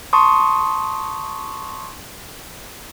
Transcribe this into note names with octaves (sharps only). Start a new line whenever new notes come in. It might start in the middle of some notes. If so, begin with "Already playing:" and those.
A5 C6 C#6 D#6